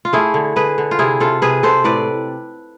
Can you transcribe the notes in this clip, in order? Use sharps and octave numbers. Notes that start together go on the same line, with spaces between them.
F4
A3 E4 G#4
D3
D3 G#4 B4
D3
F4
C3 E4 G#4
C3 F4 A4
C3 G#4 B4
C3 A4 C5
A2 B4 D5